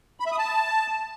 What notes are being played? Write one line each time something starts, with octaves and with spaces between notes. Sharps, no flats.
B5
E5
D#6
A5